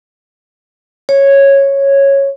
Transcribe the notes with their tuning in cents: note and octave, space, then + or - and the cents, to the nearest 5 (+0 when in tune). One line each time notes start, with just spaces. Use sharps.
C#5 -5